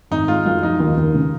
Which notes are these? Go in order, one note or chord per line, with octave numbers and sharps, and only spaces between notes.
G#1 D#4
G#3 F4
F#2 F4
F3 D#4
D#2
D#2
C#3